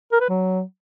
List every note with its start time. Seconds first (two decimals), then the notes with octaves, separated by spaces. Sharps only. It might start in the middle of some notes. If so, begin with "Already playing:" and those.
0.12 A#4
0.21 B4
0.29 F#3